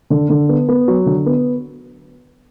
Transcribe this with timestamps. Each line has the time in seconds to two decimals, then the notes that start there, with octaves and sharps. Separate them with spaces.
0.10 D3
0.30 D3
0.49 B3
0.69 B3
0.88 F#3
1.06 D3
1.26 B3